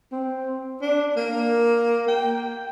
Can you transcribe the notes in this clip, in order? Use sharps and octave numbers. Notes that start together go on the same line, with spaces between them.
C4
D4
A#3
G5